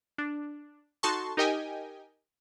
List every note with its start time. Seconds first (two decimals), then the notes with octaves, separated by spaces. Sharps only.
0.18 D4
1.03 D#4 F#4 A4 A5 C6 C#6
1.37 D#4 G4 A#4 D#5 G5 G#5